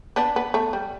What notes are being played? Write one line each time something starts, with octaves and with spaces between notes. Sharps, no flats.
B3 D4
B3
A3
G3